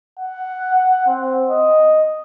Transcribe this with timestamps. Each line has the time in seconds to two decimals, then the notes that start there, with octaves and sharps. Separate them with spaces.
0.19 F#5
1.07 C4
1.50 D#5